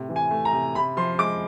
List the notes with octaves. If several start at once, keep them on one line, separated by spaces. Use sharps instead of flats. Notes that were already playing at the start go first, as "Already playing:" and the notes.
Already playing: A2 C3
E3
G#5
A3
A#5
C3
C3 B5
F3 C6
G#3 D6